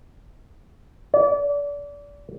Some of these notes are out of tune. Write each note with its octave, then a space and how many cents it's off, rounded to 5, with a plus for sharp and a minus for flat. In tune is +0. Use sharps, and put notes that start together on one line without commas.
D5 -30